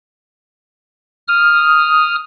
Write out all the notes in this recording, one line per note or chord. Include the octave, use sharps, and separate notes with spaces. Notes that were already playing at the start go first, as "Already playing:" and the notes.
D#6 F6